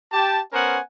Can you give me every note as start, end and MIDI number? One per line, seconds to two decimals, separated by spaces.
0.12 0.40 67
0.12 0.40 79
0.12 0.40 81
0.53 0.79 59
0.53 0.79 61
0.53 0.79 70
0.53 0.79 72
0.53 0.79 78
0.53 0.79 80